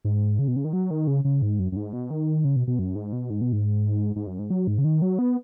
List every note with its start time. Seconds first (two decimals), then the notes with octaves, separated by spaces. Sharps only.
0.05 G#2
0.39 C#3
0.48 B2
0.56 C#3
0.65 D#3
0.73 F#3
0.91 D#3
1.07 C#3
1.25 C#3
1.42 G#2
1.59 F#2
1.72 F#2
1.76 G#2
1.93 B2
2.10 D#3
2.45 C#3
2.56 B2
2.67 B2
2.79 F#2
2.95 G#2
3.13 B2
3.30 G#2
3.41 B2
3.53 G#2
4.16 G#2
4.27 F#2
4.39 G#2
4.50 F#3
4.67 G#2
4.78 C#3
4.84 D#3
5.02 F#3
5.19 B3